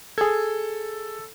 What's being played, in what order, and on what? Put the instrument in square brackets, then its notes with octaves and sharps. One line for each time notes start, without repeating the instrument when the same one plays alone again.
[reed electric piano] G#4 G#6 [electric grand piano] A4